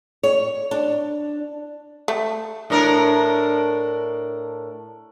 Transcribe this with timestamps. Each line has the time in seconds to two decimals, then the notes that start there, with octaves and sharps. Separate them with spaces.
0.23 C#5
0.71 D4
2.08 A3
2.70 A2 D4 A#4